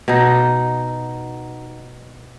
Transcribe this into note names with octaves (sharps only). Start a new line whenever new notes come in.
B2 D#4